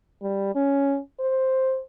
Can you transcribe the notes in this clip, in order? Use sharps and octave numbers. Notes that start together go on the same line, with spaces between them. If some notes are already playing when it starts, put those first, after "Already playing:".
G3
C#4
C5